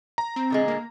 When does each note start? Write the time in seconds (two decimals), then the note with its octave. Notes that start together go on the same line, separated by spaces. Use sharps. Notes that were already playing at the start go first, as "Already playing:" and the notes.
0.18 A#5
0.36 C4
0.50 A#2 D3 G#3
0.68 A#3